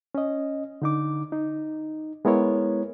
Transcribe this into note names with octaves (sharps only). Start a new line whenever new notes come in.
C#4 D#5
D3 D#4 D6
D#4
G#3 B3 E4 A#4 C#5